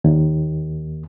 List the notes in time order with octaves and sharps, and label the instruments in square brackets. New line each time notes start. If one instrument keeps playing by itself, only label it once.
[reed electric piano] D#2